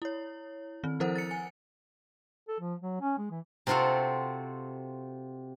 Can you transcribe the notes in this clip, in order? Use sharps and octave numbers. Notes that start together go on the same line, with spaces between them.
E4 C#5
D#3 C4
F3 E4 A4 A#4 C5 F#5
A6 C#7
G#5
A4
F3
F#3
C#4
G#3
E3
C3 C4 F4 F#4 A4